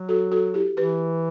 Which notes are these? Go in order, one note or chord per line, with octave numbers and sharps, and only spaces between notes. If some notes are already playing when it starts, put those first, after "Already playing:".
Already playing: F#3
F#4 A4
F#4 A4
E4 G4
E3 G4 B4